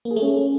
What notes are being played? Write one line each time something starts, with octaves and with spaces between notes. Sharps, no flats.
A#3
G#4
A3
C#4